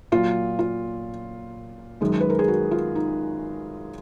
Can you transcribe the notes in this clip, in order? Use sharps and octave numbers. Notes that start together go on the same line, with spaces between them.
A#2 F#3 F4
F4
F#2 D#3 G#3
B4
A#4
G#4
F#4
F4
D#4